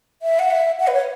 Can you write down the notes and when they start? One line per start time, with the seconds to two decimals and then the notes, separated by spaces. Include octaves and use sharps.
0.22 E5
0.39 F#5
0.51 E5
0.80 F#5
0.87 B4
0.94 C#5